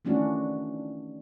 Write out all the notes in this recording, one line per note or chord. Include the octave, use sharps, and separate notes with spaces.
D#3 E3 A3 C#4 D4 F#4